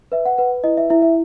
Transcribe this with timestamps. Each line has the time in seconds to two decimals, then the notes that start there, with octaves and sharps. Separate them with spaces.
0.12 B4 E5
0.25 F#5
0.38 B4 F#5
0.64 E4 D#5
0.77 E5
0.90 E4 E5
1.02 E5